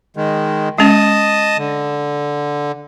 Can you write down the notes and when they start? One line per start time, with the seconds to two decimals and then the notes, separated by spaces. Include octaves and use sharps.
0.17 D#3 G#3
0.78 G#3 C#4 D#5 A5 D#6
1.58 D3